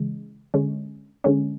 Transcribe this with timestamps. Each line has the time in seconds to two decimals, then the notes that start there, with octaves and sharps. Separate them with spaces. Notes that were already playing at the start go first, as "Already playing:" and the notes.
Already playing: C#3 E3 G#3
0.54 D3 G#3 C#4
1.24 D3 G#3 C#4